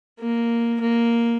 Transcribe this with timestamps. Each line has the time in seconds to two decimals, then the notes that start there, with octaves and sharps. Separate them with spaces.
0.20 A#3
0.80 A#3